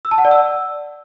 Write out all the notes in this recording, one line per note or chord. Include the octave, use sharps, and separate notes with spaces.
E6
A5
F#5
D5
E6